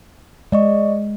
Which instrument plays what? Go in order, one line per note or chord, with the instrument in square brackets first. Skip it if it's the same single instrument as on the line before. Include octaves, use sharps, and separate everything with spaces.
[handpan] G#3 [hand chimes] D5 D#5 C#6